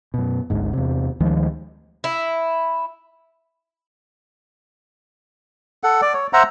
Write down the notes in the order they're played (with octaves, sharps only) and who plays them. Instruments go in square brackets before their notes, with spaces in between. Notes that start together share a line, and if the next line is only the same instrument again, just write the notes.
[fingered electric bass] F#2 B2
G#1 D2 G#2
E2 C3
D2 D#3 F3 G#3
[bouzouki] E4
[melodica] A4 F#5
D5
C#5
C5 E5 F#5 A#5